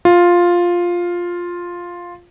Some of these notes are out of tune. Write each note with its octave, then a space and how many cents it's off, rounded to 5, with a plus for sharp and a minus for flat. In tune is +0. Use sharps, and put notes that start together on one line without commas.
F4 +5